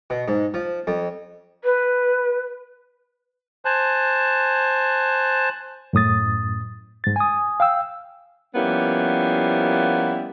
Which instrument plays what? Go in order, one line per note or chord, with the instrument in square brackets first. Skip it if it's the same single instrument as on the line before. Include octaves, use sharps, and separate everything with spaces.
[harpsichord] B2
G#2
F3
F2
[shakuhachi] B4
[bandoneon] C5 G#5 A5 F#6
[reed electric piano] F#2 A2 D#6 A6
G#2 A6
G#5 D#6
F5 G5 E6
[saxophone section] F3 G3 A#3 B3 C#4 E4